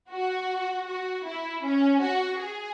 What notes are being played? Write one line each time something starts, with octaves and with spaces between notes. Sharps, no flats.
F#4
F#4
E4
C#4
F#4
G#4